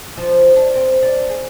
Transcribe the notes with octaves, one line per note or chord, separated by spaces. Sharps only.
F3
D4
C4
D4
G#4